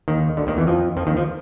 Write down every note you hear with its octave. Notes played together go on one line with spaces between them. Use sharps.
D#2 D#3
D2 D3
D#2 D#3
E2 E3
F2 F3
F2 F3
D#2 D#3
F3